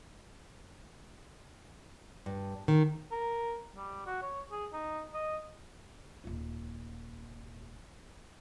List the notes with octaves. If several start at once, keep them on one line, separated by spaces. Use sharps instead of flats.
G2
D#3
A#4
G3
F#4
C#5
G#4
D#4
D#5
D#1 F4